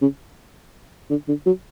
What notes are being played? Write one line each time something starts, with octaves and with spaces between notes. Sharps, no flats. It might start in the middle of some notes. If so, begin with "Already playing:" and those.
C#3
D3
D3
F#3